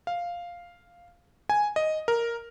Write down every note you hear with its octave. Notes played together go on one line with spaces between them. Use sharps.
F5
G#5
D#5
A#4